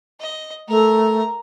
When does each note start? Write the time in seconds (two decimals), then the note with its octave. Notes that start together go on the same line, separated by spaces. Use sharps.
0.20 D#5
0.68 A3 A#4 A#5